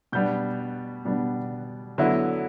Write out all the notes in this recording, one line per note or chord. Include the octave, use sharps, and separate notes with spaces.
B2 G3 B3 D4 G6
B2 G3 B3 D4
D3 F#3 B3 E4